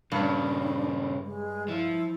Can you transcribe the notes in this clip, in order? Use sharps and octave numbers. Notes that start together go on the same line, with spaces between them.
G2 A#2 C#3 D4
G#3
F3 E4